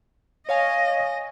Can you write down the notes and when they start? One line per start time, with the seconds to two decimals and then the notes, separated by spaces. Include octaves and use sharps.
0.49 C#5 D#5 F5 G#5